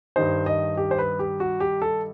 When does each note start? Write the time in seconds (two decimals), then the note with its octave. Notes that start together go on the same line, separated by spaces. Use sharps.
0.16 G2 D#3 G3 D#4 C5
0.46 D#5
0.77 G4
0.91 C5
0.98 B4
1.19 G4
1.40 F#4
1.60 G4
1.82 A4